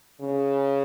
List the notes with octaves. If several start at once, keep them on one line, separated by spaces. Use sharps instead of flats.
C#3